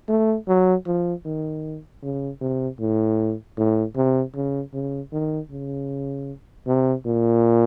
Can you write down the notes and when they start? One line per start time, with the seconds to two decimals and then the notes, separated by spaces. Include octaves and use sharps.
0.09 A3
0.48 F#3
0.87 F3
1.25 D#3
2.03 C#3
2.41 C3
2.80 A2
3.57 A2
3.96 C3
4.35 C#3
4.73 C#3
5.13 D#3
5.51 C#3
6.67 C3
7.05 A#2